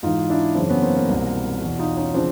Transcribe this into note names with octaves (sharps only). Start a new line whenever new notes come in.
G#2 E3 D#4 F4
D4 E4
F#2 C#3 E3 C4 D4
B3 C#4
A#3 C4
A#3 C4
C2 B2
E2 B2
D#4 F4
C#4 D#4
C#3 F3 C4 D4